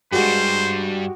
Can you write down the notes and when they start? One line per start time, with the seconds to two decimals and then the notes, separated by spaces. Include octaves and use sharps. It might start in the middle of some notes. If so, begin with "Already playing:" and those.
0.12 G2 G3 G#3 F#4 G4 C5